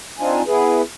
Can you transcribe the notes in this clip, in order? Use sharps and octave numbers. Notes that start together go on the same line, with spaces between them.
C4 D4 D#4 F4 G#5
B3 E4 G#4 B4